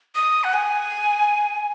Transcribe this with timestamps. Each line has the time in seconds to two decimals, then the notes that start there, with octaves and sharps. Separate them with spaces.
0.15 D#6
0.44 F#5
0.53 G#5